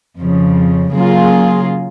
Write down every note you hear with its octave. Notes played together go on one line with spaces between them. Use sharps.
F2 C#3 F3
C#3 F#3 A#3 F4 G#4